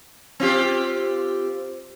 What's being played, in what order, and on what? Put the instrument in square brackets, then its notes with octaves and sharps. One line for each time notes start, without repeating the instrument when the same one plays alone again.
[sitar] C4 F4 G4